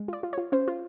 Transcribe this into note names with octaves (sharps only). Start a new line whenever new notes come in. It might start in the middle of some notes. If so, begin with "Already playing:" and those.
Already playing: G#3
F4 D5
F4
C#5
F4
C#4 C5
F4